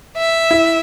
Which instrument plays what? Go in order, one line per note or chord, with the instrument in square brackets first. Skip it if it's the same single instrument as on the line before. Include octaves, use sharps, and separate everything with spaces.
[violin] E5
[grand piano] E4